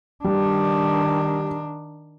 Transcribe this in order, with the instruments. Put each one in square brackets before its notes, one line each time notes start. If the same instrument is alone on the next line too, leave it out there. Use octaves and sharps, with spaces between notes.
[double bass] D#3 D4 [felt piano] G3